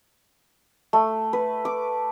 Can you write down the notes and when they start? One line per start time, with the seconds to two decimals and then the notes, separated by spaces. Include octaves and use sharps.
0.93 A3
1.33 B4
1.65 D6